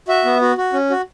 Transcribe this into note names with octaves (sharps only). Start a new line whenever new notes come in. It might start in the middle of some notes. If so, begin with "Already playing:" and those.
F#4 E5
B3
F#4
F#4
C#4
F#4